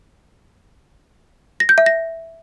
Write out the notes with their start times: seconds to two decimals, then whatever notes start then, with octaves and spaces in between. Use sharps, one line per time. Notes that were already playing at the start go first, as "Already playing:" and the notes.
1.60 A#6
1.69 G6
1.78 E5
1.86 A#6